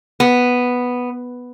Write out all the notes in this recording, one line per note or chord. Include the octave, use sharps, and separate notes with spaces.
B3